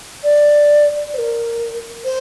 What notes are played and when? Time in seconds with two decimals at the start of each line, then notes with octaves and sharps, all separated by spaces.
0.24 D5
1.13 C5
1.17 A#4
2.04 C5